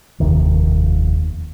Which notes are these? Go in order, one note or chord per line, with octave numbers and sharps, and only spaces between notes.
F1 D#2 C3 D#3